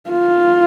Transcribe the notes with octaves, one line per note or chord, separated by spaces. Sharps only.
F4